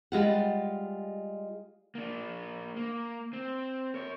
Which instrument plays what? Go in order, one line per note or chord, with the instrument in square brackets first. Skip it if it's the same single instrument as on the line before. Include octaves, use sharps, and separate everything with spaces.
[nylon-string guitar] G3 G#3 F4 F#5
[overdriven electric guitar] A#3 D4
A#3
C4
A#4 C#5